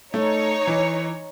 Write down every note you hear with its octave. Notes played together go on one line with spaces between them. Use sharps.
A3 D#4 C#5
E3